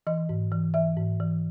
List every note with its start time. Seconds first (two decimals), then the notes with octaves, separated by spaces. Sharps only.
0.07 E3 D#5
0.29 G#2
0.52 E3
0.74 E3 E5
0.97 G#2
1.20 E3